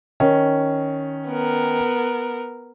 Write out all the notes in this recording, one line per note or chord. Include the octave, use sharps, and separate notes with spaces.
D#3 C#4
B3 A#4